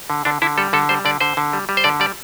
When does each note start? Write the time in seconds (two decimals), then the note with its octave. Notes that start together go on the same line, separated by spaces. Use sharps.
0.10 D3
0.25 D3 D4
0.42 D3 E4
0.58 G3 A4
0.73 D3 A4
0.89 G3 C5
1.05 D3 D5
1.20 D3 C5
1.37 D3
1.53 G3
1.69 G3
1.77 C5
1.84 D3 D5
2.00 G3 D5